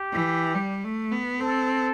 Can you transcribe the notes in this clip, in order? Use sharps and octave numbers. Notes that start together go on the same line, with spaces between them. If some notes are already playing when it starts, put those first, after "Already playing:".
Already playing: G4
E3
G3
A3
B3
C4 A4